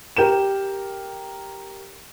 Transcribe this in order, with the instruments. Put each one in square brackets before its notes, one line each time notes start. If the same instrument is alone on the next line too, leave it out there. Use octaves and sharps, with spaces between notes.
[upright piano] G4 A#4 G6 E7